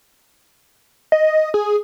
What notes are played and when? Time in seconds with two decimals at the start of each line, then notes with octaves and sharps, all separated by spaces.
1.12 D#5
1.54 G#4